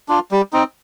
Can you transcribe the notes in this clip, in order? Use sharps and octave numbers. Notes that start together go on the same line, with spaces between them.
D4 F4
G3
C4 D#4